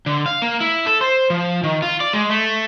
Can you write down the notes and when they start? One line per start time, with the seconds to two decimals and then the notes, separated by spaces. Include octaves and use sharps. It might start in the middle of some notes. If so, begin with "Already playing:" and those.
0.06 D3
0.26 F5
0.42 A#3
0.61 E4
0.86 A4
1.01 C5
1.30 F3
1.63 D#3
1.82 F4
2.00 D5
2.13 G#3
2.30 A3